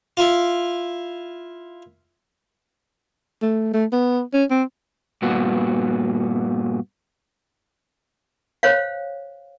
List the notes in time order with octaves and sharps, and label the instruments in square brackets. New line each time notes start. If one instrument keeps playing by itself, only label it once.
[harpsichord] E4 F4
[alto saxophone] A3
A3
B3
C#4
C4
[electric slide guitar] G2 A#2 B3 F#4
[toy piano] C5 C#5 F5